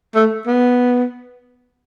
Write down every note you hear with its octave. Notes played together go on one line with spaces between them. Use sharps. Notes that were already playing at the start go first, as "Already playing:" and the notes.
A3
B3